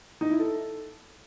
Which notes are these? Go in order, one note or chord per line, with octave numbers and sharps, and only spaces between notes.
D#4
E4
A4